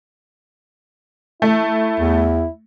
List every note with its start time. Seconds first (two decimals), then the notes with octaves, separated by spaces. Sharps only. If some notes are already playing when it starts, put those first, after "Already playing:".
1.42 A3 E4
2.00 E2